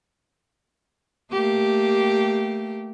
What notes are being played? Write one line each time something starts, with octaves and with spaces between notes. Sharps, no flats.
A3 A#3 G4